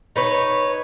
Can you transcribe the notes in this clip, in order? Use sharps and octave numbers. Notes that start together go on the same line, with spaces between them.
D#4 B4 C#5